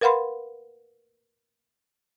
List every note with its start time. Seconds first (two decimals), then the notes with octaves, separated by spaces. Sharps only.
0.01 A#4 B4 F5 F#5 B5 C6